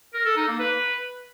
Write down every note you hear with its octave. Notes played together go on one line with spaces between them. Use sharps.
A#4
A4
D#4
A#3
B4